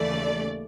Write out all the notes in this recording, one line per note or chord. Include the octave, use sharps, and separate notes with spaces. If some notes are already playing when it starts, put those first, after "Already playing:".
Already playing: D#2 C#3 E3 A3 D5